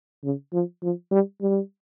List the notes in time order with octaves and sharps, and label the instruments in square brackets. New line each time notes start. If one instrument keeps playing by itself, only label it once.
[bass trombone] C#3
F3
F3
G3
G3